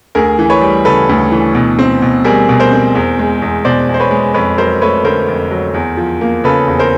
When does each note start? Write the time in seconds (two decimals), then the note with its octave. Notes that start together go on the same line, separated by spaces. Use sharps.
0.15 D2 G#4 A#4
0.39 E3
0.50 B4 C#5
0.61 G3
0.85 C#3 A4 B4
1.09 D2
1.32 E3
1.55 B2
1.79 C4
2.02 B2
2.24 G3 G#4 A#4
2.49 B2
2.60 A#4 C5
2.72 C4
2.95 E2
3.19 G#3
3.42 E2
3.65 B2 C5 D5
3.89 E2
3.94 C5
4.00 B4 C#5
4.11 G#3
4.34 F2 B4 C#5
4.58 F#3 A#4 C5
4.81 A3 B4 C#5
5.04 D3 A#4 C5
5.28 F2
5.51 F#3
5.74 E2
5.97 F3
6.21 A#3
6.44 C#3 A4 B4
6.68 E2
6.79 A#4 C5